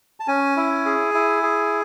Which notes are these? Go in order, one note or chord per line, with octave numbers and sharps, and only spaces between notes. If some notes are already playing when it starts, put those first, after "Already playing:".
A5
C#4 G#5
E4
G#4
E4
G#4